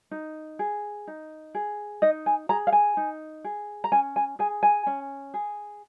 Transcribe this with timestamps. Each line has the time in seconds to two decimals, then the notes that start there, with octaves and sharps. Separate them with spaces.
0.11 D#4
0.59 G#4
1.08 D#4
1.55 G#4
2.02 D#4 D#5
2.26 G#5
2.49 G#4 A#5
2.67 F5
2.72 G#5
2.97 D#4
3.44 G#4
3.84 A#5
3.92 C#4 G#5
4.16 G#5
4.39 G#4 G#5
4.63 G#5
4.87 C#4
5.34 G#4